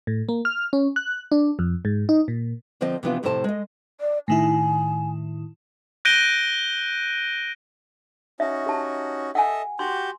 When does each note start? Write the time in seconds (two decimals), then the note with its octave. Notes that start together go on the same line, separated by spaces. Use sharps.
0.07 A2
0.29 A#3
0.45 F6
0.73 C#4
0.96 F#6
1.32 D4
1.59 F2
1.85 G#2
2.09 D#4
2.28 A#2
2.81 D3 F3 C4 C5 D#5
3.03 C3 E3 F3 B3 D4 F4
3.23 F2 A2 C3 A4 C5 A5
3.44 G#3 D#5
4.01 D5
4.28 A2 D#3 E4 G#5
6.05 F#6 G6 A#6 D7 D#7 G7
8.40 C#4 D#4 F#4 E5
8.66 G4 A5
9.35 A4 D#5 E5 F#5 G#5
9.79 F#4 G4 C6 G6